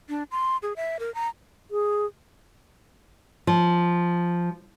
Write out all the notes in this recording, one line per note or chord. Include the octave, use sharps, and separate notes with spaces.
D4
C6
G#4
E5
A#4
A#5
G#4
F3